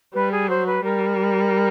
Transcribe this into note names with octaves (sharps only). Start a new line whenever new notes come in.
G3 B4
G#4
F#3 C5
B4
G3 A#4